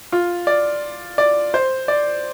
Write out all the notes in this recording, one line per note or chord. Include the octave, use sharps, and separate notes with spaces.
F4
D5
D5
C5
D5